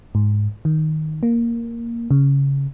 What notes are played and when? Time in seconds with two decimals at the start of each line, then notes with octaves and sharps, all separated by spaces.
0.15 G#2
0.65 D#3
1.23 A#3
2.11 C#3